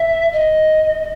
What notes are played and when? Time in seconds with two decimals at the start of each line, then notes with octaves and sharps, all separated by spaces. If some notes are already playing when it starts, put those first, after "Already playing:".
Already playing: E5
0.32 D#5